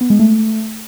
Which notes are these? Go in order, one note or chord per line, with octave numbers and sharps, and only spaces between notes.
B3
G#3
A3